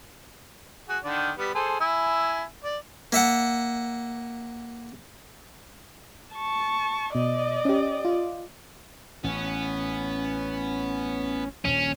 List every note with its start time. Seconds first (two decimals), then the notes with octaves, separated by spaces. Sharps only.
0.89 F#4 G#4
1.04 D3 D#3 D5
1.37 G3 B3
1.55 G#4 A4 C5
1.80 E4 G#5 E6
2.64 D5
3.12 A#3 E5 F#5
6.34 A5 C#6
7.15 B2 D5 D#5
7.65 C#4 G4
8.05 F4
9.24 A1 B3 C#4
11.65 D#1 A#1 F3 C#4